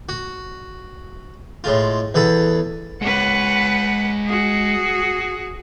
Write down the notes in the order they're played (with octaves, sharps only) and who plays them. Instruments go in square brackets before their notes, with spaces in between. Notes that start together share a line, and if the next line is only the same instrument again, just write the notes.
[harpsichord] F#4
A2 G#3 F4
E2 G#4 A4 B5
[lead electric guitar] G#3 C#5 [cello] B4 F#5
[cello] F#4 G#4